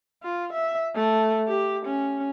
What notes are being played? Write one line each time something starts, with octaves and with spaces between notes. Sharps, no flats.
F4
E5
A3
G4
C#4